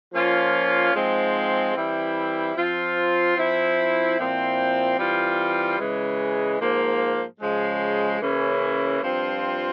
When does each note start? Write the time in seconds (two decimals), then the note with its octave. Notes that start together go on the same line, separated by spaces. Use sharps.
0.13 F3 A#3 C#4 F4
0.94 G#2 F3 G#3 C4
1.75 E3 G3 C4 E4
2.57 F3 C4 F4
3.37 F3 C4 E4
4.18 A#2 F3 C4 E4
4.98 E3 G3 C4 F4
5.79 C#3 E3 G#3
6.60 G#2 F3 A#3
7.41 C#3 F3 G#3
8.21 C#3 E3 A#3 C#4 E4
9.02 G2 F3 C4 F4